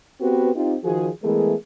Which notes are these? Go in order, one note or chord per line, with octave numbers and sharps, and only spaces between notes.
B3 C4 F#4 G4 B4
C4 D#4 F4 G4
D#3 F3 F#4 G#4
E3 G#3 A3 B3 G#4 A#4